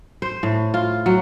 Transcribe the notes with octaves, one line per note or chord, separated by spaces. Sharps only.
C5
A2
F4
F#3